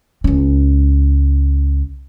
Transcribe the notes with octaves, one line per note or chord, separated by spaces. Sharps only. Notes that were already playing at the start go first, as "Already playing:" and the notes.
C#2 C#4